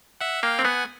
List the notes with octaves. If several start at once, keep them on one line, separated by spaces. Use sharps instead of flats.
E5 F#5
A#3 F5 G5
C4
B3 F#5 G#5